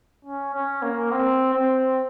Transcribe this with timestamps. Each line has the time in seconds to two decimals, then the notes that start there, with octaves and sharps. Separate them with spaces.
0.25 C#4
0.54 C#4
0.82 A#3
1.12 C4
1.54 C4